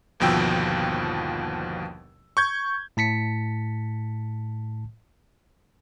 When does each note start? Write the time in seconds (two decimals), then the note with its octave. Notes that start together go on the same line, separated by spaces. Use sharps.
0.20 G1 D#2 B2 F3 G5 E6
2.37 C#6 G6 G#6
2.97 A2 A5 B6 C#7